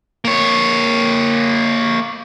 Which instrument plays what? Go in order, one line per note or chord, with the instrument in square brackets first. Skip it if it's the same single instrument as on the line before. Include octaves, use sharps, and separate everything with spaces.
[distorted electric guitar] A#3 C#5